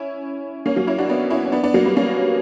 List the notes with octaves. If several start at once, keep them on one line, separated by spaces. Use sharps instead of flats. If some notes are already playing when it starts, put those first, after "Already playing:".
Already playing: C#4 E4
A#3 C#4
F#3 A#3
C#4 E4
D4 F#4
B3 D4
C#4 E4
C#4
B3 D4
B3 D4
F#3 A#3
G3 B3
A#3 C#4